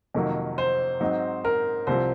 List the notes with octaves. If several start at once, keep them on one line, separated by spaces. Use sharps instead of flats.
F2 C3 D#3 F#3 A#3
C5
G#2 F#3 C4 D#4
A#4
C2 C3 F3 C5